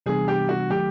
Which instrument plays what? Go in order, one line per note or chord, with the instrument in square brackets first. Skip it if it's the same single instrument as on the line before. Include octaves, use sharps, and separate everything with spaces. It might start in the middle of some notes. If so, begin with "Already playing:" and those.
[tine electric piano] C3 E3 G3 B3 D4 [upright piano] G#4
[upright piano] G4
F#4
[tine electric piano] D#3 F#3 A3 [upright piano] G4